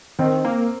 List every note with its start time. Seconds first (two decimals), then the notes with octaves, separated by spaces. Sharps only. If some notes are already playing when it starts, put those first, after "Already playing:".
0.19 D#3 C4
0.45 A#3